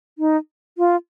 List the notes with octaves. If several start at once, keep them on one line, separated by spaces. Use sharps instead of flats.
D#4
F4